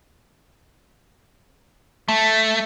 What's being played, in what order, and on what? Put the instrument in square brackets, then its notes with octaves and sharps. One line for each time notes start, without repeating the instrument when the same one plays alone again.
[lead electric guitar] A3